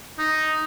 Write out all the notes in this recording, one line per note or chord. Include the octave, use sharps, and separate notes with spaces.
D#4